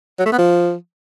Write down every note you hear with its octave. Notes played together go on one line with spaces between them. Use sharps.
F#3
A3
B3
F3